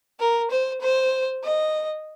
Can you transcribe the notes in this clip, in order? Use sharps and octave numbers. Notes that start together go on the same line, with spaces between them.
A#4
C5
C5
D#5